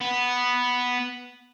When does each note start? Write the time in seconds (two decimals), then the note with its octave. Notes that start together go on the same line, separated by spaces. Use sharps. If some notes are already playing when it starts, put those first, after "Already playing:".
0.01 B3